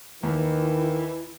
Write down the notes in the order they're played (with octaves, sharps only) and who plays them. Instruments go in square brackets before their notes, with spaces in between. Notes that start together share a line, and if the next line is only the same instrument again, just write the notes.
[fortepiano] D#2 [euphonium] D#3 [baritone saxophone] E3 [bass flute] E4